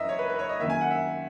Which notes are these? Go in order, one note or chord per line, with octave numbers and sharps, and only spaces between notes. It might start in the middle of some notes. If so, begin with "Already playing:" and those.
Already playing: F#2 E3 D#5 E5
C#5
B4
B4
C#5
D#5
F#2 D#3 A#3 E5
G#5
F#5
E5